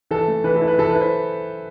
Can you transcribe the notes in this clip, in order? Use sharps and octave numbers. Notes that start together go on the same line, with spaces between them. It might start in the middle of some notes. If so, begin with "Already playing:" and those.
E3 A4
A3
E3 B4
A4
E4
B4
E3 A4
B4
E4
C5